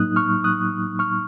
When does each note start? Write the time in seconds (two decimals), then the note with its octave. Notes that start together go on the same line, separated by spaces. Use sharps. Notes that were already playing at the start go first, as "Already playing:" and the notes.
Already playing: A2 F#3 A#3 D#4 D#6 F#6
0.16 C#6 F6
0.44 D#6 F#6
0.99 C#6 F6